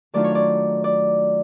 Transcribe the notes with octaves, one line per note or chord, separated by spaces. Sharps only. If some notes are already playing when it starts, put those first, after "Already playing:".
D#3 F#3 A3 D4 F4 D5
C#5
D5
D5